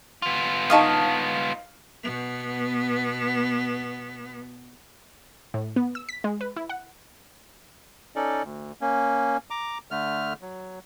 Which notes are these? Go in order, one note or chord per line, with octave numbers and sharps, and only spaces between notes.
B3 F4
D#4 F5 A5 C#6 D#6
B2 B3
A2
B3
E6
B6
G#3
B4
E4
F#5
C#4 D#4 A4 D5
D2
A#3 C#4
A#5 D6
D3 A3 F6
F#3